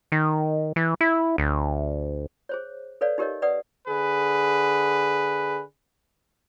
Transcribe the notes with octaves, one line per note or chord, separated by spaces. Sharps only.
D#3
E3
E4
D2
G#4 C5 C#5
A4 B4 C#5 D5 F5
D#4 G4 A#4 C#5 D#5
B4 D5 F#5 D#6
D3 G#4 B4